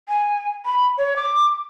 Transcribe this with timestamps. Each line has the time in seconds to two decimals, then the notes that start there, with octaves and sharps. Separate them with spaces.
0.09 G#5
0.65 B5
0.98 C#5
1.16 D6